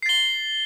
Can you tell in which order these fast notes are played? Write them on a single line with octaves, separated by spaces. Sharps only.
C7 A6 G7